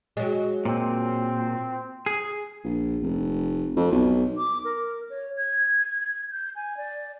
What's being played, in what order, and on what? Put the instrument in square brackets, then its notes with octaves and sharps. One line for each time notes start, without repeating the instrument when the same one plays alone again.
[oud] F#3 G#3
[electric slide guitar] A#2 [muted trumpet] C4
[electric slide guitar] G#4
[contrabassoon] A#1
F1
F2
B1
[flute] D6
A#4
C#5
G#6
G6
G#5
D5